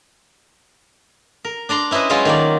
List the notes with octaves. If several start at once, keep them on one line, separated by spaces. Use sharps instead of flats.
A#4
D4 D5 A#5 C6
C#4 E4 B4 C5 D#5
F#3 G#3 C#4 E4 F4
D#3 A#3 D5